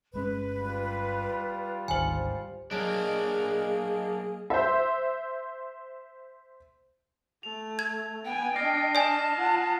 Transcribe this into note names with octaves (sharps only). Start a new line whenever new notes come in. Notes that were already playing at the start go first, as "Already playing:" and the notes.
G1 G#3 C#4 B4
G3 F4
G#1 D2 D#3 C5 G#5
F#3 A#3 D4 G#4 D#5 D7
C5 E5
A3 F7
G#6
B3 G5 G#5
D4 D#5 F6 A#6 C7
D5 G#5 A5 D#6
F4 F#5